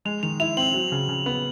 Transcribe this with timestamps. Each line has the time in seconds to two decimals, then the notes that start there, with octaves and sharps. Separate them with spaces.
0.05 G#3 F7
0.23 D#3 F7
0.40 E4 F7
0.57 C4 F#7
0.74 F#3
0.92 C#3
1.09 C#3
1.26 B3